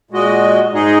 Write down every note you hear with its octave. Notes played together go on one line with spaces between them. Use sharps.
A#2 G#3 F#4 D#5
G#2 G#3 D#4 G#4 D#5